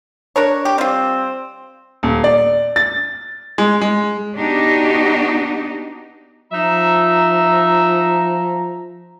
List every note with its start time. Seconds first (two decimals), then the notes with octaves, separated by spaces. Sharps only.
0.36 D4 A#4 C#5
0.65 G4
0.78 G3 C4 F4
2.03 D#1
2.24 D5
2.76 A6
3.58 G#3
3.81 G#3
4.38 B3 D4 D#4 F#4 G4 D#5
6.52 F3 D#4 E5 A#5